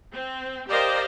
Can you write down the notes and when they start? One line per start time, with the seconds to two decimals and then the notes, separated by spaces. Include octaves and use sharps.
0.12 C4
0.68 G4 A#4 C5 D5 D#5 F5